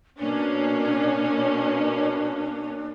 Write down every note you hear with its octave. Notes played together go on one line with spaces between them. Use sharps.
B2 A#3 C#4 D4